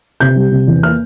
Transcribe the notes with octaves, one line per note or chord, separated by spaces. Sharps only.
C3 G6
G3
C3
E2
A#3 F6